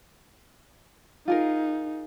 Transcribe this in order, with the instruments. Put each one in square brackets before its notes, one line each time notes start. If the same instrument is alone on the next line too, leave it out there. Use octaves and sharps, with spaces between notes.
[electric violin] D#4 [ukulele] F4 G#4 A#4